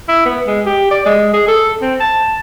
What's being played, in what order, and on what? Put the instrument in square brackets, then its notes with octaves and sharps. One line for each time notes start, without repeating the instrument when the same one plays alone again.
[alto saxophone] E4
B3
G#3
G4
D5
G#3
G#4
A4
C4
A5